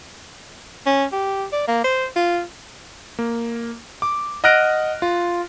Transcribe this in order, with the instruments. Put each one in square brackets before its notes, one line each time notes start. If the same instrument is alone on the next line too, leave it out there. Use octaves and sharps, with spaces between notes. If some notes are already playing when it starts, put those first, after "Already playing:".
[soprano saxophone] C#4
G4
D5
A#3
C5
F4
[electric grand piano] A#3
D6
D#5 F#5 F6 F#6 A#6 D7
F4